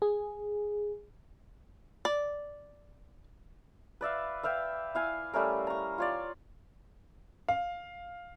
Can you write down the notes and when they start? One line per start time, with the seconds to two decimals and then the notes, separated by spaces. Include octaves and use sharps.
0.02 G#4
2.05 D5
4.01 B4 D5 E5 F5
4.43 B4 E5 F5 G5
4.95 E4 F5 G#5
5.33 G3 A3 C#4 A#4
5.67 A#5 C#6
5.98 F4 C#5 D5
7.49 F5